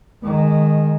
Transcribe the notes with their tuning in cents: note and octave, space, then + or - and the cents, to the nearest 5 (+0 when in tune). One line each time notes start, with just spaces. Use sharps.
D#3 -15 G#3 +0